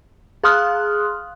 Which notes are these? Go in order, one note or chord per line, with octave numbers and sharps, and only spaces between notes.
G#4 F5 C6 D#6 F6 F#6